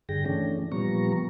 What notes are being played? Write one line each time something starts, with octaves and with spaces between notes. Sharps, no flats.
G2 D3 G#4 G5 A#6
E3 A3 C#4 D4
A#2 F3 G3 B3 A#5 C#6